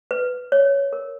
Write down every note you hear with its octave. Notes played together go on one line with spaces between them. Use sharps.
B4
C#5
A#4